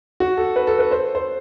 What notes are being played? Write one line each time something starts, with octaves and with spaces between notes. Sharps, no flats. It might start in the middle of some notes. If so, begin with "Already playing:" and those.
F#4
A4
B4
A4
B4
C5
C5